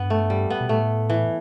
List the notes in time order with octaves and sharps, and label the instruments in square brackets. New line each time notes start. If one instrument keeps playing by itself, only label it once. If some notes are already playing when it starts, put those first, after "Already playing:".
Already playing: [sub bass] G2 [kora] B3
[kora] A3
G3
B3
[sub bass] B2
[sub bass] A2 [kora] A3
[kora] E3